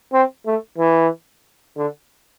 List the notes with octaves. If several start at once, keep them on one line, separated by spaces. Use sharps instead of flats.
C4
A3
E3
D3